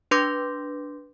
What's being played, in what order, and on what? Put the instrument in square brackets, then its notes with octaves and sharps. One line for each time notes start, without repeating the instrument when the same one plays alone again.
[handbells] D4 B4 C6 D6 G6 A#6